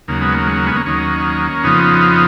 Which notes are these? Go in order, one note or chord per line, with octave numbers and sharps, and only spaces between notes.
D#2 C#3 F#3 A#3
G#3 B3
A#3
G#3
A#3
G#3 B3
A#3 C#4
D#2 D#3 F#3 A#3 C#4
F2 C#3 F3 B3 D#4